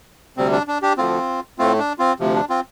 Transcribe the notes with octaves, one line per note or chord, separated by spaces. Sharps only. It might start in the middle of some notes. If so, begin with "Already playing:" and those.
D2 C3 G3 C4
D4
D4
D4 G4
D2 D3 F3 C4 F4
A2 A3 C4 F4
D4
C4 F4
D2 C3 F3
D4
C4 F4